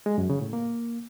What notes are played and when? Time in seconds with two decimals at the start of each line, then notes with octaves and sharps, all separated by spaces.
0.06 G#3
0.18 F#2
0.30 C#3
0.41 A2
0.53 A#3